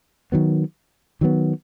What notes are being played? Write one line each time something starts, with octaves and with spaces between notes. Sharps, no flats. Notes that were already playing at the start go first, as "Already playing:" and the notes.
D#3 F#3 B3
D#3 F#3 B3